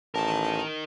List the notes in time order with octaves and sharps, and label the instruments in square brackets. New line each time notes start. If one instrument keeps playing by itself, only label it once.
[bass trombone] A1 [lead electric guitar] D#4 A#4 [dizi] A5